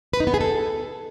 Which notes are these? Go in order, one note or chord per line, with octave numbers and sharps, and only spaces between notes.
B4
D#4
B3
G#4
A4